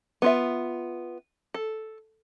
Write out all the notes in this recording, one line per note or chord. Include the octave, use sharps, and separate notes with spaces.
B3 F4 E5
A4